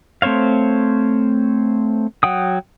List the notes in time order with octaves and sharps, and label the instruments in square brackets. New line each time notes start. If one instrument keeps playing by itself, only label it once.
[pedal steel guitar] A3 C4 C5 C#5 F5
F#3 F#5 G5 D#6